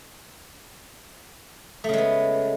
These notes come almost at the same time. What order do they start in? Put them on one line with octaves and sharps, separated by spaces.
A3 C#3 G#3 B3